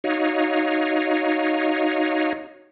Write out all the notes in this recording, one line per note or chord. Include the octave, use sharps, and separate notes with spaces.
D#4 F#4 C#5 D#5 F5